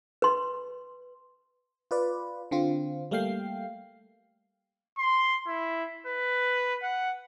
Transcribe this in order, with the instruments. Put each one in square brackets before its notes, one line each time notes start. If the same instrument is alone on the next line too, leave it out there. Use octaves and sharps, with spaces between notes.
[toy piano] B4 C6
[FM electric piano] F4 B4 D5
D3 C4 F4
G3 A3 A#3 F5 G5 C7
[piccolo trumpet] C6
E4
B4
F#5